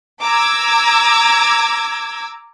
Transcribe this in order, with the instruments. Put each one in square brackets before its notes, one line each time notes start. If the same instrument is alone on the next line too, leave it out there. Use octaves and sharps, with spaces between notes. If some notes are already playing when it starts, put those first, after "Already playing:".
[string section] A#5 D6 E6 G#6